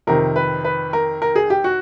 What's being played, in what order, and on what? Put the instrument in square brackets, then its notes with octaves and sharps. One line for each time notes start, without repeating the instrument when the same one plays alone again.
[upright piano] F2 C3 D#3 A#4
B4
B4
A#4
A#4
G#4
G4
F#4